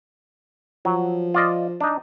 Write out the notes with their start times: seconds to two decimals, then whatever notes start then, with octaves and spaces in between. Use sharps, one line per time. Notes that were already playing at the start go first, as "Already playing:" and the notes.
0.85 F3 F#3
1.34 F4 D5 D#5
1.81 D4 D#4